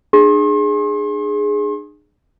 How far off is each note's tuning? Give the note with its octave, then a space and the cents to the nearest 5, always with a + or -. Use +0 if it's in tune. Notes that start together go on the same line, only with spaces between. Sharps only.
D4 +45 G#4 +0 C6 +40